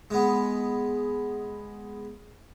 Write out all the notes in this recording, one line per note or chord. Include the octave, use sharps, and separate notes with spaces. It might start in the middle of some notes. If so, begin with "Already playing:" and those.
G#3 B3